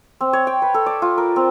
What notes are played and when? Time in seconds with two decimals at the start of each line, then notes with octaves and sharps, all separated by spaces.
0.21 C4
0.33 C#5
0.47 G5
0.62 B4
0.74 A4
0.86 D5
1.02 F4
1.18 A#4
1.36 C4